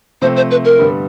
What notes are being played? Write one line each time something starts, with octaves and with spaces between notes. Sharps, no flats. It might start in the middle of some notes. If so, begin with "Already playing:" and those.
C3 F3 A3 C4 C5
C5
B4
A#4
G2 D3 G3 B3